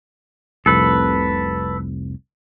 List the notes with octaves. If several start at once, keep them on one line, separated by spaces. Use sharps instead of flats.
F1 C2 A4 B4